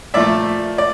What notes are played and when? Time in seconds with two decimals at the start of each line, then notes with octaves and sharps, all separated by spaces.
0.14 A#2 F3 A3 D5 E5
0.78 D5